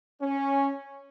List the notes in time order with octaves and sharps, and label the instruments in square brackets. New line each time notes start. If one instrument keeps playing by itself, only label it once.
[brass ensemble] C#4